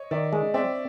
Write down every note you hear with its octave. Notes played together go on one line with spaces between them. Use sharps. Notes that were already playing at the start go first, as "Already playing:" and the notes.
Already playing: C#5 D#5
D#3 D5 E5
G#3
C4 D5 E5